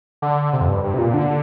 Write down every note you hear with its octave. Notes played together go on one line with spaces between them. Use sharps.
D3
C3
F2
G2
G2
C3
A#2
D3